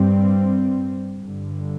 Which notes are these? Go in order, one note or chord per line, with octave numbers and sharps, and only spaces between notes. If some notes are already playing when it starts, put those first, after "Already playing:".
Already playing: G2 G3 C4
G1 G2 D3